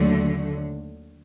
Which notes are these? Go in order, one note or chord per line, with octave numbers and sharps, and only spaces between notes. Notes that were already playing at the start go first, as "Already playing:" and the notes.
Already playing: D#2 D3 F#3 A3